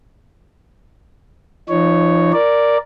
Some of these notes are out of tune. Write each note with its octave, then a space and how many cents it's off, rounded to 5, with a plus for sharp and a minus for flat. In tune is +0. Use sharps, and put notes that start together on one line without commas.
F3 -40 D#4 -30 C#5 +0
A#4 +0 D5 +0